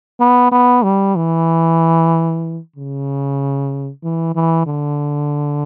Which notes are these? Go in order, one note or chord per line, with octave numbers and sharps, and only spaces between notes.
B3
B3
G3
E3
C#3
E3
E3
D3